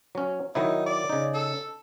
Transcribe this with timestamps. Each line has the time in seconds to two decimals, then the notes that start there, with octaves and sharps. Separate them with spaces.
0.15 F#3 C#4
0.55 D#3 F#3 D#4 E4
0.86 D5
1.09 C#3 D#4
1.34 A4